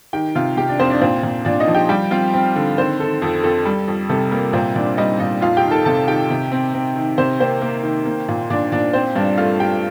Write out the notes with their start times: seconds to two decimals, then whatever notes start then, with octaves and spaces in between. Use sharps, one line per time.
0.13 D#3 G4 G5
0.35 C3 F4 F5
0.57 C3 G4 G5
0.68 D4 D5
0.79 F2 C4 C5
0.90 D4 D5
1.01 A#2 C4 C5
1.23 A#2
1.45 A#2 D4 D5
1.60 D#4 D#5
1.68 F3
1.75 G4 G5
1.89 G3 G4 G5
2.11 C4 F4 F5
2.33 C4
2.56 D3
2.77 D#3 C4 C5
3.00 D#3 A4
3.22 F2 A4
3.43 F2 A4
3.65 G3
3.88 F2
4.09 C3 A4
4.31 G3 A#3 A#4
4.53 A#2 C4 C5
4.75 A#2 D4 D5
4.97 G3 D#4 D#5
5.19 A#2 D#4 D#5
5.41 F2 F4 F5
5.57 G4 G5
5.64 D#3
5.71 A4 A5
5.85 C3 A4 A5
6.07 D#3 G4 G5
6.30 C3
6.52 C4
6.74 C4
6.96 D#3
7.17 C3 C4 C5
7.40 A#3 C4 C5
7.62 A#3
7.83 D#3
8.05 A#3
8.29 A#2
8.50 A#2 D4 D5
8.72 A#2 D4 D5
8.93 C4 C5
9.16 G2 D4 D5
9.38 A3 F4 F5
9.60 A3 G4 G5